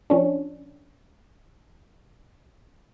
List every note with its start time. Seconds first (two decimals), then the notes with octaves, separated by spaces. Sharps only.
0.10 F3 C#4 D4